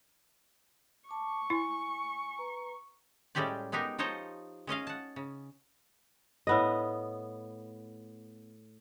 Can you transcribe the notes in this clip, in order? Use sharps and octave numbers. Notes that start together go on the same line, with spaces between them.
A5 C#6 D6
E4 G#5
B4 A#5
A2 G3 G#3 C#4 G4 D5
G#3 B3 D#4 G4 A#4
F3 D#4 C5 C#5 D#5 A5
G#3 C#4 D#5 F5
F#5 A5
C#3
A2 B3 D#5